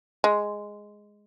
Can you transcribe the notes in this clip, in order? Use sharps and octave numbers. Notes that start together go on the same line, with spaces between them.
G#3